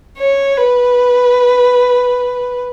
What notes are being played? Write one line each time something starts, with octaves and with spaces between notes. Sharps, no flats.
C#5
B4